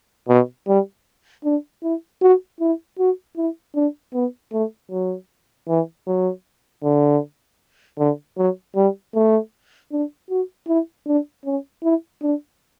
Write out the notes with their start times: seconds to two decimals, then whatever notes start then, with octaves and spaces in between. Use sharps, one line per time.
0.29 B2
0.68 G3
1.45 D4
1.83 E4
2.22 F#4
2.61 E4
2.99 F#4
3.37 E4
3.75 D4
4.14 B3
4.53 A3
4.91 F#3
5.69 E3
6.07 F#3
6.84 D3
7.99 D3
8.37 F#3
8.76 G3
9.15 A3
9.92 D4
10.30 F#4
10.68 E4
11.07 D4
11.45 C#4
11.83 E4
12.22 D4